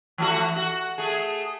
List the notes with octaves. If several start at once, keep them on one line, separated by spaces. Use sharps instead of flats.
E3 A3 F#4
F#4
A3 G#4